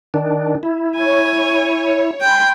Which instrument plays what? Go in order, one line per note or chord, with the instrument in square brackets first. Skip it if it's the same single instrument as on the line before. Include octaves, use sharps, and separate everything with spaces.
[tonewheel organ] D#3 D4
E4
[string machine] C#5 [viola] G#5
[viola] G5 [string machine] G#5 B5 C6